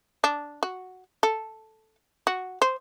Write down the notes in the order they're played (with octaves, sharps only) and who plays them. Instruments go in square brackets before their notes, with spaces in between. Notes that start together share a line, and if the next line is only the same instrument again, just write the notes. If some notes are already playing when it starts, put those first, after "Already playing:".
[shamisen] D4
F#4
A4
F#4
C5